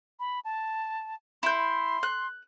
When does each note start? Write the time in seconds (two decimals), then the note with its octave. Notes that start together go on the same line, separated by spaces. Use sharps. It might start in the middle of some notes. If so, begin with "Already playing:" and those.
0.20 B5
0.45 A5
1.43 E4 C6 G6
2.03 F#6